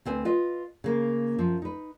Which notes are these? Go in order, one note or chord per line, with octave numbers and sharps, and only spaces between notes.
D2 C4 B4 G#5
F4 B4 D#5
C#3 A#3
F#2 F3
D#4 B4